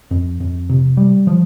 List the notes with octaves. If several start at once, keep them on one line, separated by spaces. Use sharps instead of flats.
F2
F2
C3
G3
F3